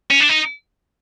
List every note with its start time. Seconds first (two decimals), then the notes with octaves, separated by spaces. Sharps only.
0.11 C#4
0.20 D4
0.29 D#4